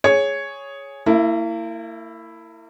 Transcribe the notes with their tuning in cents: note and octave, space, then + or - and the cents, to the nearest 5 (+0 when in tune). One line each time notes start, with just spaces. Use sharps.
G#4 +0 C#5 +0
A#3 -40 E4 +5